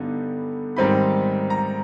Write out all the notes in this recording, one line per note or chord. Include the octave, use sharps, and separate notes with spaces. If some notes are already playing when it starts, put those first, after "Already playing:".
Already playing: G2 D3 G3 B3 D#4
G#2 D#3 G3 C4 D#4 B5
A#5